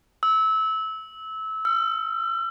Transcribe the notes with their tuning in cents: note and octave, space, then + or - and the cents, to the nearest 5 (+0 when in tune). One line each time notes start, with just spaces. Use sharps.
E6 -25
E6 +45